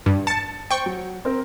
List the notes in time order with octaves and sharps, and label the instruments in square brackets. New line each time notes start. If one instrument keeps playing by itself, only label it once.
[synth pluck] G2
[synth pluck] A5 [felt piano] A6 C#7
[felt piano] C5 [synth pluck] G5 C#6
[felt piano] F#3
C4 A#4